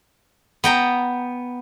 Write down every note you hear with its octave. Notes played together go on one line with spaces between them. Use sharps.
B3 G5 A#5